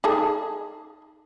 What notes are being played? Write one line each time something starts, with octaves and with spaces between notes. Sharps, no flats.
D#4 G#4 A4